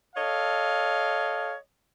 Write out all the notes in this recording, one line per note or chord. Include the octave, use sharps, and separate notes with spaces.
A4 C#5 D#5 F5